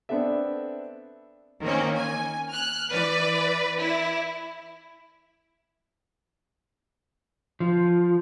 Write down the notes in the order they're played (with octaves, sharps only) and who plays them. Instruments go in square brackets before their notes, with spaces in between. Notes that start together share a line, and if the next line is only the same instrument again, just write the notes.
[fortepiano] B3 C4 D4 A4 E5
[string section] D#3 A#3 C4 C#4
G#5
F6 F#6
E3 B4 D5
E4
[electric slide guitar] F3